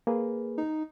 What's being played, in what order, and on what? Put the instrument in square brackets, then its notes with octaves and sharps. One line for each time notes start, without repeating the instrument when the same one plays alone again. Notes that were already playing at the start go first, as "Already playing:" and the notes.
[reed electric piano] A#3 G#4 B4
[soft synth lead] D#4